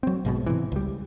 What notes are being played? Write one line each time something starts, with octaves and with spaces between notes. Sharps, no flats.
F#3 C4
B1 G#2 B2
C3 E3
C#2 G3